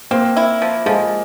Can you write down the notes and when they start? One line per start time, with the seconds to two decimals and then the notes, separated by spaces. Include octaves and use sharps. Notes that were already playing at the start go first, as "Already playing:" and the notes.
0.11 A#3 C4
0.36 E4
0.62 F3
0.86 F3 G#3